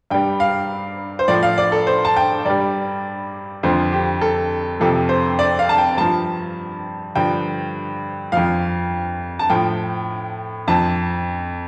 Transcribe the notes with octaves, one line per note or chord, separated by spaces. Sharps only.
G2 G3 G5
F5
C5
A2 F3 D5
F5
D5
A4
C5
A5
G5
G2 G3 D5
F2 D3 F3 C5
G4
A4
F2 C3 F3 A4
C5
D5
F5
A5
G5
G2 F3 A5
G2 D3 F3 G5
F2 F3 F5
A5
A2 F3 G5
F2 F3 A5